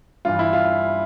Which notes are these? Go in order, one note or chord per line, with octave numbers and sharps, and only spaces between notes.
G2 E3 F4
E4
F4